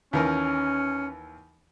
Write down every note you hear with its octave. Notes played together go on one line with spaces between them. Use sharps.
D#2 E3 C#4 A#4